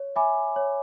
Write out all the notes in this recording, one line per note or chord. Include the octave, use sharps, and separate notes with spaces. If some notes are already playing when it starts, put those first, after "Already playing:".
Already playing: C#5
E5 G#5 B5 D6
C#5